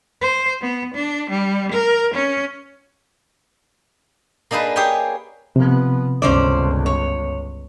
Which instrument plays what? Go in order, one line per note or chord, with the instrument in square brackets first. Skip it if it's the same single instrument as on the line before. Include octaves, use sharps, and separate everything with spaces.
[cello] C5
B3
D4
G3
A#4
C#4
[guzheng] A#3 D4 D#4 G#4 B4
G4 G#4 C#5 E5 G5
[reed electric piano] C3 [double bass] F3 B3
[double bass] G1 C#2 [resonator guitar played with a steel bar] C#4 C5 D5
[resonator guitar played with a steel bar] C#5